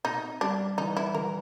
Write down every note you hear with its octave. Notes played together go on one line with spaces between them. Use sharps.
C3 D#4
G3 D4
E3 D#4
E4
E3 A#4